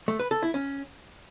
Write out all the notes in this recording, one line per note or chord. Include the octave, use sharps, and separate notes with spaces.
A3
B4
A4
E4
C#4